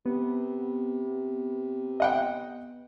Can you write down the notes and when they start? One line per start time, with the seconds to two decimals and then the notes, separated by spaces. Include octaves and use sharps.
0.06 C3 B3
2.00 D#5 F#5 G5